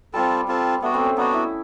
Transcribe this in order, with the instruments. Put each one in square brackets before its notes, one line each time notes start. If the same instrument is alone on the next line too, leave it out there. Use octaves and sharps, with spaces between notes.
[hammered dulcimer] G3 [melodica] C4 F4 A4
[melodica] C4 F4 A4
[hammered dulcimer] A3 [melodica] B3 D4 F#4
[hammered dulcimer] C4
C#4
[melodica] B3 D4 F#4 [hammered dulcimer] D#4
[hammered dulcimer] E4